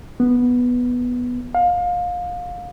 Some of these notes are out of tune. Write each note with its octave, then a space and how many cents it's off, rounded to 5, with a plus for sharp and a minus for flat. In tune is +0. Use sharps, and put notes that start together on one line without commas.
B3 -5
F5 +25